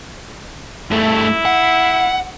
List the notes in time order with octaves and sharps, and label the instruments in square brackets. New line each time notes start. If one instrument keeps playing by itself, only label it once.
[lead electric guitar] G2 A3 [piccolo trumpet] E4
[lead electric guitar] F#5